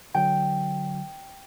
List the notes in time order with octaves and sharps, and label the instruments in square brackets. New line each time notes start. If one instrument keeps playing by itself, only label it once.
[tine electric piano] D3 F#3 [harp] G5